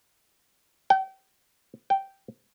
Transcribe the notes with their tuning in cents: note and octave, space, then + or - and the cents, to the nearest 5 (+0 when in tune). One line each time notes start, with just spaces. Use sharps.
G5 -35
G5 -10